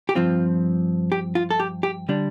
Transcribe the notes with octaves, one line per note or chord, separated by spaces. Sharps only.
G4
G2 F3 C4 F4
G4
F4
A4
G4
G4
D3 G3 D4